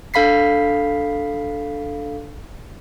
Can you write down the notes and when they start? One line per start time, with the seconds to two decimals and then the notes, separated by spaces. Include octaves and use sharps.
0.14 D4 A4 F5 B5 B6 C7